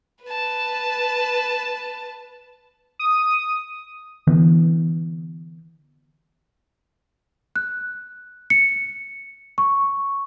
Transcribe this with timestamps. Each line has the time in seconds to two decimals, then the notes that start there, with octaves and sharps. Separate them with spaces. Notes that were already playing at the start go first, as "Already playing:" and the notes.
0.24 B4 A5
2.99 D#6
4.27 D3 E3 B3
7.56 F#6
8.50 C#7
9.58 C#6